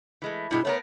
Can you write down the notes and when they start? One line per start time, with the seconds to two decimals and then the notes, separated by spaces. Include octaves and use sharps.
0.22 E3 G#3 A3
0.51 G2 B2 G#3 E4
0.65 A3 B3 A#4 C#5